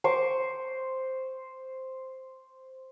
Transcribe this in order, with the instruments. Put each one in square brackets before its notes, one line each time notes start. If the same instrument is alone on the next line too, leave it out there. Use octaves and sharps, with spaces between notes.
[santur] C5 C#6 D6